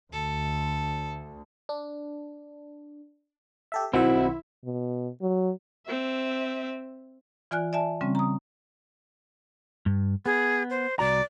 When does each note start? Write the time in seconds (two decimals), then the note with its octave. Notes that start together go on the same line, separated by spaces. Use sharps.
0.12 D2 A4
1.69 D4
3.72 G4 A4 E5
3.93 B1 D#3 C4 E4 F#4 C5
4.65 B2
5.22 F#3
5.87 C4 E5
7.51 E3 F4 D5 G#5 F6 F#6
7.73 D5 E5 G#5 A5
8.01 C#3 G3 C4 C#4
8.15 A#5 D#6
9.86 G2
10.26 B3 G#4
10.70 C5
10.99 C2 F#4 D5 A#5